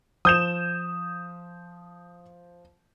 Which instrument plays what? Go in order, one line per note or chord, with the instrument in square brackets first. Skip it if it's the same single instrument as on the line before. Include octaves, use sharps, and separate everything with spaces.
[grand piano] F3 [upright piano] D#6 G6 E7